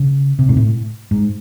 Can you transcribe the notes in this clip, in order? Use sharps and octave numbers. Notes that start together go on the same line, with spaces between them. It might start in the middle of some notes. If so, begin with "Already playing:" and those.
Already playing: C#3
C3
G#2
A2
G#2